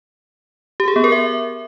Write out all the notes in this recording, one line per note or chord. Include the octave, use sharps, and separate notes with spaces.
G4
G#4
B3
A#4
E5